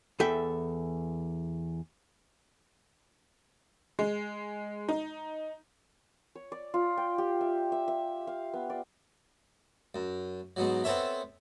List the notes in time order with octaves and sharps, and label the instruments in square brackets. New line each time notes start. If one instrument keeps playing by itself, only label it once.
[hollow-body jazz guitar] E2 A4 E5 G5
[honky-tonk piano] G#3
D#4
[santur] C#5
D5
F4
G5
G4
E5
E5
E5
F5
B3
D5
[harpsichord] F#2
G#2 B2 F#3
B3 C4 A4 C#5 E5